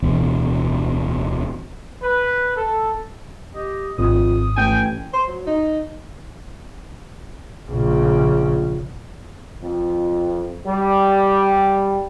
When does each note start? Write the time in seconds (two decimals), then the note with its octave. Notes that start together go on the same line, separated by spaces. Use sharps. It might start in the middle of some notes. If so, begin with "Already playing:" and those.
0.02 D1 E2 B2 E3
2.03 B4
2.56 A4
3.55 G4 D#5
3.98 G#1 F2 D#6
4.57 A1 G5 G#5
5.13 C5
5.28 F#3
5.46 D#4
7.71 A#1 C#3
9.62 F2
10.67 G3